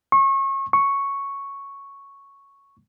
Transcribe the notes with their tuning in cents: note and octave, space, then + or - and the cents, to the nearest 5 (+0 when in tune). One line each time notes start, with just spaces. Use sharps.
C#6 -30
C#6 +0